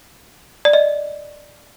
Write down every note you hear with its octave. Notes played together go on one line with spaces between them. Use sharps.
D5
D#5